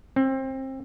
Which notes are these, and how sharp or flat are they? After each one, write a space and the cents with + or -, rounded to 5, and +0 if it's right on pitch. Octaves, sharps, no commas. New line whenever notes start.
C4 +25